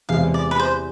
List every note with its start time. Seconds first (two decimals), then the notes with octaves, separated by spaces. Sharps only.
0.09 E2 C3 E3 G#3 F5
0.34 D5
0.51 B4
0.60 C5